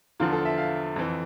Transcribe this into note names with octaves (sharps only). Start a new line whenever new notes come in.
E2 D3 F3 F4
A4
E5
F5
F2 E3